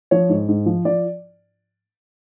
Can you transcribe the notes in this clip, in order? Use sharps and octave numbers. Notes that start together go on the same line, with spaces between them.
F3 C#5
G#2
G#2
F3
F3 D5